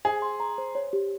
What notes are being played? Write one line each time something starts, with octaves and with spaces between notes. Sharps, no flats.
G#4 C5
C6
A#5
C5
C#5
G4